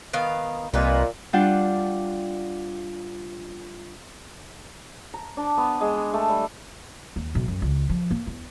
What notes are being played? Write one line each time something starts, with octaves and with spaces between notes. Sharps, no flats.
D#3 B3 F5
C2 A#2 D#4 B4
G3 D4 F4 F#5 G5
A#5
D4
B3
G#3
C6
A3
G3
D#2
B1
F#2
C#2
F3
A#3
E2